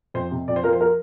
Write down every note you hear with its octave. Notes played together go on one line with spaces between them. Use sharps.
F2 C5
C3
F2 D5
C5
F3 A#4
C5
A#4